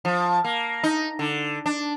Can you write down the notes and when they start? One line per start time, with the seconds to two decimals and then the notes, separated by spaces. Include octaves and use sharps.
0.05 F3
0.44 A#3
0.84 D#4
1.19 D3
1.66 D4